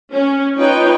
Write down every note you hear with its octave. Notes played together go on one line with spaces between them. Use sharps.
C#4
D#4 F4 B4 C#5 G5